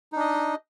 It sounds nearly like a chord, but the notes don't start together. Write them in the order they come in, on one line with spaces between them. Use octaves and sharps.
D#4 D4 D#5